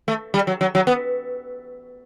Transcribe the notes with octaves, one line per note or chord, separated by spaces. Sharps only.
A3
G3
F#3
F#3
F#3
B3